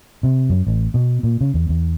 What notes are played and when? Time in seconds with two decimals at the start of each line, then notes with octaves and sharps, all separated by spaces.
0.23 C3
0.50 F#2
0.67 A1
0.94 B2
1.23 A#2
1.41 C#3
1.54 E2
1.69 E2